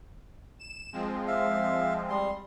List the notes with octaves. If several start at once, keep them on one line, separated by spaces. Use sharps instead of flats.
E7
F3 G#3 C4
E5 F5
G3 C6